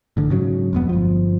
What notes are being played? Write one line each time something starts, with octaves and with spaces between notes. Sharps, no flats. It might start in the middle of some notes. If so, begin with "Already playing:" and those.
A1 D3
G#2 C#3 F#3
E1 F2 B3
G1 F3